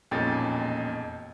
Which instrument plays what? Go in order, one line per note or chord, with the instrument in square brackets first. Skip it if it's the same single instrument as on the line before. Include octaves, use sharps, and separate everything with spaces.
[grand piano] E1 F2 A#2 C#4 D#4 A6